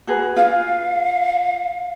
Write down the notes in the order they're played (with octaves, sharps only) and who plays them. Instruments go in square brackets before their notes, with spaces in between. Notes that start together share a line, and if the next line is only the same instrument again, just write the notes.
[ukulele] F#4 G#4 B4
[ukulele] F4 [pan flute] F5